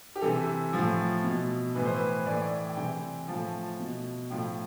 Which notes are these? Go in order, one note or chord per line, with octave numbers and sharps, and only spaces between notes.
G4
C3 E3 A4
A2 F3
B2
A2 E3 B4
C5
B4
A2 E3 D5
D5
G5
C3 E3 G5
A2 F3 A5
B2
A2 F3 G5